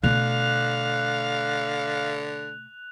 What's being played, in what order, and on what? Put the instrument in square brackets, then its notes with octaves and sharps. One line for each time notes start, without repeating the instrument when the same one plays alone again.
[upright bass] B2 A3 [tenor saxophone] D3 [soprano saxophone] F5 [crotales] F#6 F7